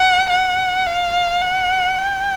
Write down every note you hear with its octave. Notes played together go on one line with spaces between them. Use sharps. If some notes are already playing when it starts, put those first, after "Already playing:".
Already playing: F#5
F#5
F5
F#5
G5